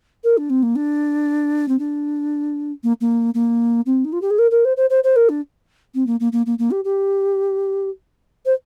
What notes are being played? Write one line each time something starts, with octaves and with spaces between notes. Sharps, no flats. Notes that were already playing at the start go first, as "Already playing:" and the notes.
A#4
D4
C4
A#3
D4
C4
D4
A#3
A#3
A#3
C4
D#4
F4
G4
G#4
A#4
A#4
C5
C5
C5
C5
A#4
D4
C4
A#3
A#3
A#3
A#3
A#3
G4
G4
C5